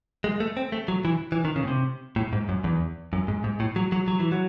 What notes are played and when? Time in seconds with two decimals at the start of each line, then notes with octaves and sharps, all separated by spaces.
0.24 G#3
0.40 A3
0.57 C4
0.72 A3
0.88 F#3
1.05 E3
1.32 E3
1.45 D#3
1.56 C#3
1.64 A2
1.68 C3
2.16 A2
2.33 G#2
2.49 F#2
2.64 E2
3.13 F#2
3.28 G#2
3.44 G#2
3.60 A2
3.76 F#3
3.92 F#3
4.08 F#3
4.20 E3
4.32 F#3